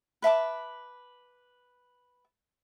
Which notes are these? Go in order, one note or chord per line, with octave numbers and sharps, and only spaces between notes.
B4 E5 A5 D6